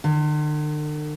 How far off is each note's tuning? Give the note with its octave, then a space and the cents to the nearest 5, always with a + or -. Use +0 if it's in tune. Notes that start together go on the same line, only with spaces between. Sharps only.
D3 +45